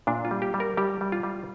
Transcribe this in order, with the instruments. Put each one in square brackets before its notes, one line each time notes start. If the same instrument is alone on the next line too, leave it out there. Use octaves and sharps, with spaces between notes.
[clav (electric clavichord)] A#2 D4
F4
G3
G4
G3
A#4
G3 G4
G3
F4
G3